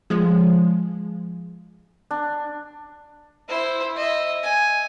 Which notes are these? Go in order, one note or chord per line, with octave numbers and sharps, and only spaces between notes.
F3 G#3
D4
E4 C5
D#5 E5
G#5